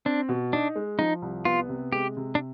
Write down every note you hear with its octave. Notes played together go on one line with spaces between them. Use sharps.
C4 D4
B2
D4 D#4
G#3
F3 D#4
C2
B3 F4
C3
G#3 G4
C3
D4